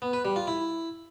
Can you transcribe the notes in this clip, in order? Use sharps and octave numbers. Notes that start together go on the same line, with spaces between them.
B3
B4
G3
F4
E4